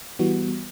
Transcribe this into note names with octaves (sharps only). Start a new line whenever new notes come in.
E3 G3 B3 F#4